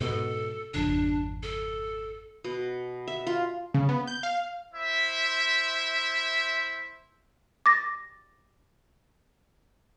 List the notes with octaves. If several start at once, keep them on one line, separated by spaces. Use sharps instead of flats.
G#2 B2 A4
G#1 F2 C#3 D4
A4
B2
E5
F4
C#3
B3
G6
F5
E4 C5 E5
D6 A6 A#6